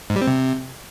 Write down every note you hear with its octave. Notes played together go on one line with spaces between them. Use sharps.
G#2
G3
C4
C3